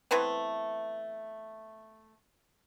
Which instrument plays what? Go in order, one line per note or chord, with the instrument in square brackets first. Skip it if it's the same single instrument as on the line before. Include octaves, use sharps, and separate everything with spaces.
[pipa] E3 A3 B3 C4